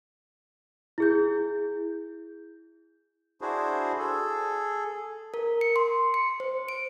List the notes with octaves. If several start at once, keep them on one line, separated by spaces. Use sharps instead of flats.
E4 G#4 G6
D4 E4 F#4 G#4 C5
G#4 A4
A#4
C#7
C6
C#7
C5
D7